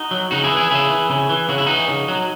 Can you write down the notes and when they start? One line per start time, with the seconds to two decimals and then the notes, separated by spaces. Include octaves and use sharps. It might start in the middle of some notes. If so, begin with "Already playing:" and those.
Already playing: D#4 F#4
0.11 F#3
0.31 C#3 D#4 F#4
0.44 E4 G#4
0.51 E3
0.57 E4 G#4
0.71 C#3 E4 G#4
0.90 E3
1.10 C#3
1.29 E3
1.49 C#3 F#4
1.58 E4
1.66 E3 D#4 F#4
1.88 C#3
2.08 F#3